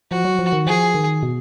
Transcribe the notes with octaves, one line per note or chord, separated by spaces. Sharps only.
F3 F#4
F#3
F3
D#3
F3 G#4
D#3
B2